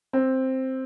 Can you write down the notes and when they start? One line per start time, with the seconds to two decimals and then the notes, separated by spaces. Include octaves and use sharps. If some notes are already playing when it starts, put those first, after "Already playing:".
0.13 C4